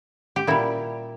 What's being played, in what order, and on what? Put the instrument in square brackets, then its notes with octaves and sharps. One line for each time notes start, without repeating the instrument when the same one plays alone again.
[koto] G4
A#2 G3 E4